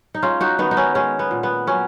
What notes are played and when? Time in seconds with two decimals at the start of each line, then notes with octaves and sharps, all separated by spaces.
0.14 D#4
0.22 G#3 C#4 F4
0.41 D#4 F#4
0.59 D#3 B3 D#4
0.71 D#4
0.77 C#4
0.95 G#3 C#4
1.19 B3
1.31 A#2
1.43 B3
1.67 F#3 C#4